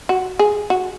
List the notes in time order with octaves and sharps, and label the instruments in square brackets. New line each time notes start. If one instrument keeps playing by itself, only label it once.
[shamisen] F#4
G#4
F#4